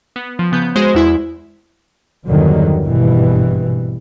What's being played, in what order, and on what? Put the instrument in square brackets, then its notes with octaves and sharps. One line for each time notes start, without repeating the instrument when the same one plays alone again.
[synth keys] B3
F3
C#3 B3 G6
G#3 F#4 G#4 C5
E2 E4 E5
[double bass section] E2 G2 D3 D#3 F3 F#3
G#1 G2 B2 E3